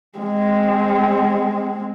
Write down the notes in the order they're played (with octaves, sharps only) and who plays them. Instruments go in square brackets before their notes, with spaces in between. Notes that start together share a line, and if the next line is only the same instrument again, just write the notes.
[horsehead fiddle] G#3 C4